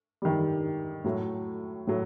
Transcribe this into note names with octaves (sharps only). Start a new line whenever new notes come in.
D#3 G3
A2 F#3 A3
A2 F#3